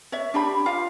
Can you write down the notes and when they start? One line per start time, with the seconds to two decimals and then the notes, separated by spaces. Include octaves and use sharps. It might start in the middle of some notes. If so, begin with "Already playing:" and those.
0.12 C#5 E5
0.34 D4 G4 B5
0.66 F4 F5